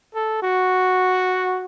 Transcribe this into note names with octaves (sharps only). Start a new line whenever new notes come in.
A4
F#4